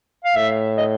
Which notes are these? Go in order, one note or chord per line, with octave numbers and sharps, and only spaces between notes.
F5
A2 E5
D#5